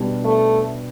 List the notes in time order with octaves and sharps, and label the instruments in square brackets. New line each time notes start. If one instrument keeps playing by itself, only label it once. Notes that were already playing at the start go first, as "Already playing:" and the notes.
Already playing: [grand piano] B2 G3 D4
[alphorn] A3